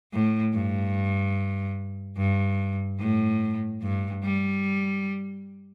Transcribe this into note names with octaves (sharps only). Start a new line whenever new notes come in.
A2
G2
G2
A2
G2
G3